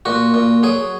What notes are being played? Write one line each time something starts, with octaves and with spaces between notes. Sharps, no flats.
A#2 F#4
A#2
F#3 G#4